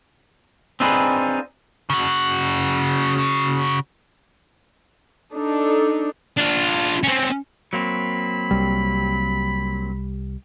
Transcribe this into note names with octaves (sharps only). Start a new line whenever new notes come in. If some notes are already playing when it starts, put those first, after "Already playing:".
C4 D4 D#4 F4 G#4 B4
C#3 F#4
D4 D#4 A4
D4 F4
C4 C#4
F#3 A#3 C4 B5
C2 G3